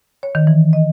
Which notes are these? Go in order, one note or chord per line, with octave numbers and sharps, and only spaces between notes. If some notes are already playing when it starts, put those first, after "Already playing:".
C#5
D#3
E3
D#5